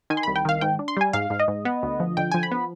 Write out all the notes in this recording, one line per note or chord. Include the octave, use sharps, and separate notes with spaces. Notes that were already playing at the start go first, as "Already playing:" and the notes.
D#3 G#5
C6
C2 B5
G5
D#3 F5
G#2 G5
D4
C6
G3 G#5
G#2 F5
G#2
D#5
G#2
B3
D2
F3
D3 G5
F3 G#5
B5
B3